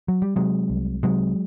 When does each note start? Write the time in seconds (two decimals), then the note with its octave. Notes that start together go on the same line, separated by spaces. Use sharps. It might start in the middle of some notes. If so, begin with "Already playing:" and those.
0.08 F#3
0.22 G3
0.36 C3 F#3 G#3
0.70 C2
1.03 C3 F#3 G#3